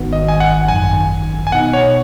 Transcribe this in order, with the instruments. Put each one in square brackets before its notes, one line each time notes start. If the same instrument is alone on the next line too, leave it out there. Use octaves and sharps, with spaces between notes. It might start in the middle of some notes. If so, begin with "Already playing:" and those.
Already playing: [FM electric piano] G#1 G#2 D#3 B3 F#4
[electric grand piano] D#5
G#5
F#5
[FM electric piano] G#1 F#2 D#3 [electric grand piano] G#5
[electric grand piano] G#5
[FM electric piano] B2 B3 D#4 [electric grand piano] F#5
[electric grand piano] C#5